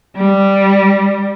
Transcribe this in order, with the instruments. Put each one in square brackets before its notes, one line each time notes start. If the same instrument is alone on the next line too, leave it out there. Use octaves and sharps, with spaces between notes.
[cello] G3